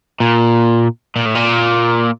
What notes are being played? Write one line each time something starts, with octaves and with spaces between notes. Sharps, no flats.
A#2
A#2
A2
A#2